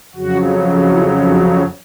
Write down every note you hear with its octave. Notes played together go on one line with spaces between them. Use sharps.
F2 C#3 F#3 F#4
E4
D#4